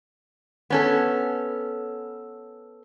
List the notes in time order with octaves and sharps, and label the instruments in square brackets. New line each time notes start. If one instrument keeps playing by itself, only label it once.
[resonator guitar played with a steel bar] B3 C#4 A4